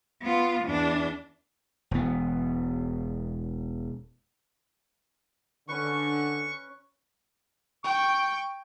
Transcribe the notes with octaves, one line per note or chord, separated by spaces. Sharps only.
B3 F4
E2 D4
E1 B3
D3 C#4 B4 C#6
G5 C#6